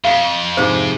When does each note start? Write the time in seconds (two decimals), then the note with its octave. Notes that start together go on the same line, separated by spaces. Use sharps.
0.04 F2 F5 A#5
0.57 G#2 C3 G4 C5 G#5